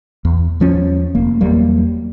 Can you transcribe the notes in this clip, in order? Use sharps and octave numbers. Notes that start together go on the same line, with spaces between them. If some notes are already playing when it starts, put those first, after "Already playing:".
E2
E2 F3 C#4
F1 A#3
E2 F#3 G3 A#3